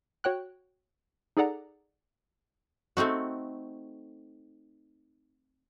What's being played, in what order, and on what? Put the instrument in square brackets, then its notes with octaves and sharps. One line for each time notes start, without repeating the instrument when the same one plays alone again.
[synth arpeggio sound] F#4 C#5 G5 F#6
D#4 G#4 A4 D5 F#5 A#5
[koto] A3 C4 D#4 F#4